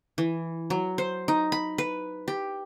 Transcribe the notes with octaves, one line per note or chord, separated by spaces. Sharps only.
E3
F#3
C5
D#4
B5
B4
G4